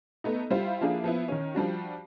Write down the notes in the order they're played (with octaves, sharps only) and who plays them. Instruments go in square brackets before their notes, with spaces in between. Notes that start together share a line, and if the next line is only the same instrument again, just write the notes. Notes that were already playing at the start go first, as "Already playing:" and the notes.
[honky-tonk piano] A3 B3 D#4
G3 E4 F4 C5
F3 A#3 D4 E4 G#4
F3 B3 E4
D#3 C#4
F3 G3 D4 F#4